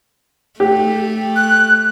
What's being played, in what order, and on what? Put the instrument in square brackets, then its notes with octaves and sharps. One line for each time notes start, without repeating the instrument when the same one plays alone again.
[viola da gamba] A3 [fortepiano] G4
[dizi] F#6